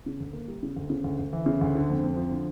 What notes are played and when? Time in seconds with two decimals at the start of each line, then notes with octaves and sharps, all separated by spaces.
0.06 C#3
0.20 D2
0.33 A#3
0.48 G3
0.63 C#3
0.76 D2
0.90 C#3
1.04 D2
1.19 D2
1.33 E3
1.46 C#3
1.61 D2
1.75 D3
1.90 F2
2.03 F2
2.17 F3
2.31 D3